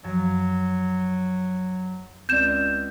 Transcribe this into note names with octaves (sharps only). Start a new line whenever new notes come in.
F#2 F3 F#3
C#2 C4 C#4 D5 G6 E7